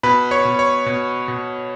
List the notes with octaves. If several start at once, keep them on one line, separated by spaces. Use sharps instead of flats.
B2 B4 B5
C#5 C#6
B2
C#5 C#6
B2
B2